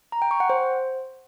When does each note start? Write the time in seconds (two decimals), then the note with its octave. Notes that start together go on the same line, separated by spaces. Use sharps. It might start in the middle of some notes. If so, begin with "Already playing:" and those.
0.12 A#5
0.22 G5
0.31 C#6
0.40 F#5
0.50 C5